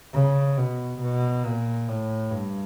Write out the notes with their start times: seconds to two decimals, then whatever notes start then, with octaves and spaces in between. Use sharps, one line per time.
0.14 C#3
0.57 B2
1.01 B2
1.45 A#2
1.88 A2
2.31 G2